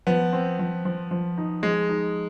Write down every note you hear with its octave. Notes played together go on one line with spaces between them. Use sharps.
F3 B3
C4
F3
F3
F3
D#4
F3 G#3
D#4